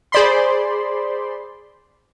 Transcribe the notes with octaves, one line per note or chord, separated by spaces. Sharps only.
G#4 C5 D5 B5 C6